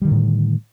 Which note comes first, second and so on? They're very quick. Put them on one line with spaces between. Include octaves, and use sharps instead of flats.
G3 D#3 D3 A2